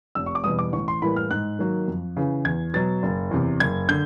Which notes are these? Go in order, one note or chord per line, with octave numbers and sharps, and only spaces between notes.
F1 E6
C#6
D6
E2 B2 G3 D#6
D6
A1 C#6
C6
A2 E3 G3 A#3 B5
F6
G#2 F#6
D#3 F#3 A#3
F2
C#3 E3
E2 G#6
B2 F#3 A6
F#1
E2 C3
F#1 G#6
D3 G6